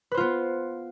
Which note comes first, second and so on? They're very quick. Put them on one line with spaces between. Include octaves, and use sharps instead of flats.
B4 C5 F4 B3